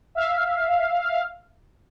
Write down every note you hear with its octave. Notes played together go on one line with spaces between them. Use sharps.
E5 F5